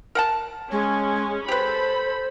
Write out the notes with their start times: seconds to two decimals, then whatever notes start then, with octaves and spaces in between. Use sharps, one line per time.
0.15 A#4 F#5 A5
0.72 G#3 C#4
1.48 G4 A4 B4 C5 B5